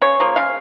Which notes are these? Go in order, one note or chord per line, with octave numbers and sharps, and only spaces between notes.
C#3 C#5
F3 A#3
C#3 F5